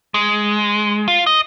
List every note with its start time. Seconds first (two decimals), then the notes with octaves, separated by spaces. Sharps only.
0.14 G#3
1.08 F4
1.27 D#5